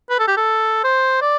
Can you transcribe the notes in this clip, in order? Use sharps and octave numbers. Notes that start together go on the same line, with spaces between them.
B4
A4
G4
A4
C5
D5